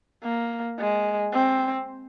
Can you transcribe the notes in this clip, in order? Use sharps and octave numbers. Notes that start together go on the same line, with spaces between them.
A#3
G#3
C4